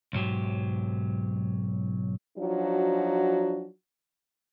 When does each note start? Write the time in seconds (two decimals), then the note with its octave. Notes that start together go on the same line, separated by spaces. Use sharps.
0.13 B1 G#2 F#3 G4
2.38 F3 F#3 D4 D#4 F4 F#4